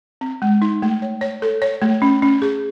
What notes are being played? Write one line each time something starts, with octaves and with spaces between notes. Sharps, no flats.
C4
G#3
D#4
A3
C#5
C#5
A4
C#5
A3
C#4
C#4
G#4